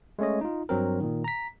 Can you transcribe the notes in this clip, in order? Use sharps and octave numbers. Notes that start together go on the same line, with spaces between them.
G#3 A3 C#4 C#5 D#5
D#4 F4
G2 F#3 C4 A#4
A#2 D#3
A#5 B6